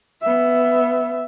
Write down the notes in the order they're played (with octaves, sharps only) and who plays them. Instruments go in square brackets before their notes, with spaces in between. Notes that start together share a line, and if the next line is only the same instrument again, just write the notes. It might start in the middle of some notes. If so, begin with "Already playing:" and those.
[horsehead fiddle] B3 E5